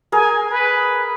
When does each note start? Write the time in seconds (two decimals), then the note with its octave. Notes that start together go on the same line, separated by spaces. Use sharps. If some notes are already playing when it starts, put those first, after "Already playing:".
0.12 G#4 A#4 G#5
0.50 B4